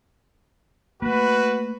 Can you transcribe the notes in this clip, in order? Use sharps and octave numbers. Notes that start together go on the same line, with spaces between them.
A3 A#3 F#4 B4